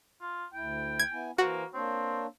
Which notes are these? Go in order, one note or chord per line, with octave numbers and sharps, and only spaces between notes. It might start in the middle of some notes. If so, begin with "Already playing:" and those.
F4
D2 E4 G5
G#6
B3 E4 G#5
E3 A#3 F#4 C5
A#3 C4 D4 C#5